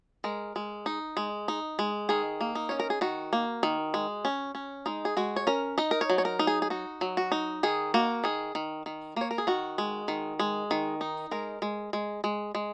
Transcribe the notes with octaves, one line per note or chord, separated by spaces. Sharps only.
G#3 A#4
G#3
D#4
G#3
D#4
G#3
D#3 G#4
A#3
D#4
C#4 C#5
A#4
G#4
D#3 F#4
A#3
D#3
G#3
C#4
C#4
G#3 D#4
G#4
G#3 F#4
C#5
C#4 A#4
D#4 D#5
A#4
C#5
F#3
C#5
A#4
D#4
G#4
G#4
D#4 F#4
F#3
F#4
D#4
D#3 G#4
A#3 F#4
D#3 G#4
D#3
D#3
A#3 C#5
A#4
G#4
D#3 F#4
G#3
D#3
G#3
D#3
D#4
G#3 A#4
G#3
G#3
G#3
G#3